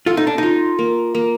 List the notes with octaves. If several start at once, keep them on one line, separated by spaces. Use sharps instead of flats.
F4 A4
D#4
D4
D#4 F4
A#3
A#3